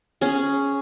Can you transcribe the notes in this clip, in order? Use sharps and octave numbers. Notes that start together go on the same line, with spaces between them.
C#4 G#4